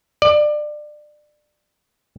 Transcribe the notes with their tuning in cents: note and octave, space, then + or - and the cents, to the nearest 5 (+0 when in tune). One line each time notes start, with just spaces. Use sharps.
D5 +25